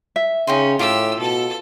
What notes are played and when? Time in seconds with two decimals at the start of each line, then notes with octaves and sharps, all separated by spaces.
0.16 E5
0.47 C#3 C#4 D#4 G5 C6
0.79 A2 F4 G4 E6
1.19 B2 A4 A5